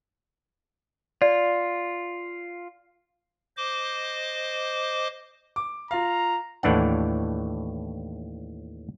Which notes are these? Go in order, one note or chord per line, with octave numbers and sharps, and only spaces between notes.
F4 D5
C5 D#5 D6
D6
F4 F5 A#5
D#2 A2 E3 D4 F#5